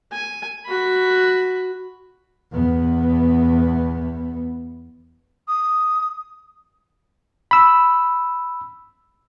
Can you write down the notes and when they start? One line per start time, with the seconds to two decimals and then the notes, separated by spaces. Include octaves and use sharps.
0.12 G#5
0.66 F#4 B5
2.52 E2 B3
5.48 D#6
7.51 B5 E6